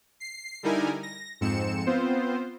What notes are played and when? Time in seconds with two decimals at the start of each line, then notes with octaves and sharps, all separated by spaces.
0.20 C7
0.63 D3 G3 D#4 E4 A#4 G#5
1.03 A#6
1.41 F2 G#2 C4 C#7 E7
1.87 B3 C4 F4 C5